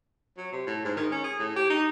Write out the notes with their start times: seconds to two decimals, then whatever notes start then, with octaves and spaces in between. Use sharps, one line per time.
0.38 F#3
0.53 C3
0.67 A2
0.85 G#2
0.96 D#3
1.12 C#4
1.24 G#4
1.40 A2
1.56 G4
1.70 D#4